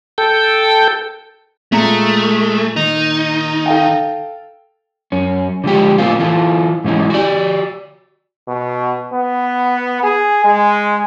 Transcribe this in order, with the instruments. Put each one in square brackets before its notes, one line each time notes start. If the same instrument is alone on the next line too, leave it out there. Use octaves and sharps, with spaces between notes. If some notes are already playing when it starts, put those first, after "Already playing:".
[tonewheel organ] A4 G5
[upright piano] A#2 A#5 C#7 [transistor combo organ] G#3 [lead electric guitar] A3
[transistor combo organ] D#3 [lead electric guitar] D#4
[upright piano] A4 F5 G5
[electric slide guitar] F#2 C#4
D3 F3 G#3 G4
A2 A#3 C4 F4
E3 F4 A4
G#2 E3 C#4 D#4 E4
F#4 G4 D5
[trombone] B2
B3
G#4
G#3